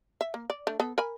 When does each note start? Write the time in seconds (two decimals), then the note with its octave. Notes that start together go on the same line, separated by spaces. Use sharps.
0.21 E5
0.34 A#3
0.50 D5
0.67 A3 D4
0.80 B3 A4
0.98 A#4 G#5 B5